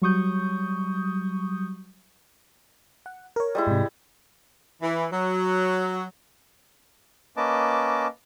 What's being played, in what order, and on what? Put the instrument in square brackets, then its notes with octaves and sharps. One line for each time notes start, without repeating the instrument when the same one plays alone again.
[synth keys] F#3 G3 C#6 D#6 G6
[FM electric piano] F#5
A#4 C#5
[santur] G3 G#3 E4
[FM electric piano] G#2 C3
[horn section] E3
F#3
[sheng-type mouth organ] A#3 C#4 B4 D#5 A5 D6